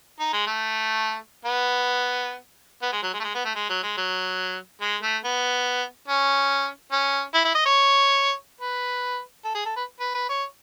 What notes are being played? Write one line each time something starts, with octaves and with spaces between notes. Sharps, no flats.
D#4
G#3
A3
B3
B3
G#3
F#3
G#3
A3
G#3
B3
A3
G#3
F#3
G#3
F#3
G#3
A3
B3
C#4
C#4
E4
E4
D#5
C#5
B4
A4
G#4
A4
B4
B4
B4
C#5